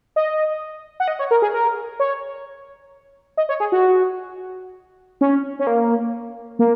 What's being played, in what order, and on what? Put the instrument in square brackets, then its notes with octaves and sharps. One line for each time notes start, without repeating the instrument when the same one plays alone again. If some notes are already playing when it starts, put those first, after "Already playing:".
[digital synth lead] D#5
F#5
D#5
C#5
A#4
G#4
A#4
C#5
D#5
C#5
G#4
F#4
C#4
C#4
A#3
A#3